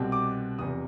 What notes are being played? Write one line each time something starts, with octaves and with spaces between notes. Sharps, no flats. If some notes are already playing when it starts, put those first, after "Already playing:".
Already playing: C2 B2 G3 C4
D6
F1 E2 C3 D#6